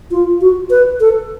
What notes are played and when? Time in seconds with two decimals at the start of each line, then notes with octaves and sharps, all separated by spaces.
0.11 F4
0.41 F#4
0.70 B4
1.00 A4